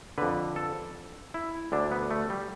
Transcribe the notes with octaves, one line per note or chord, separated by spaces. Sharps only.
F2 D3 B4
A4
E4
D2 D3 D4
B3
A3
G3